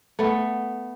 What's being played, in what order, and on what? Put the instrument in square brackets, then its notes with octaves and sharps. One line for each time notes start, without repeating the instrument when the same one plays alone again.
[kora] A3 B3